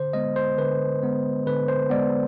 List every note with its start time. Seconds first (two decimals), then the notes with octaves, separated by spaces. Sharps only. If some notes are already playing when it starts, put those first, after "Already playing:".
Already playing: D3 C5
0.13 G#3 B3 D#5
0.36 C5
0.58 D3 B4
1.03 G#3 B3
1.46 D3 B4
1.68 C5
1.90 G#3 B3 D5